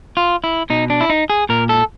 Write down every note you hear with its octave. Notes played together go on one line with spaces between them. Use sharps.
F4
E4
B2 D#4
D4
E4
D#4
G#4
A#2 A#4
A4